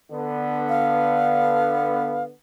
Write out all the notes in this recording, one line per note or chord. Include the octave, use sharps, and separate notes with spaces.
D3 B3
F5